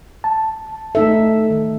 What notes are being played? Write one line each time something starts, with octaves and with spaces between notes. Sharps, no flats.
A5
A3 D#4 A4 E5
D#3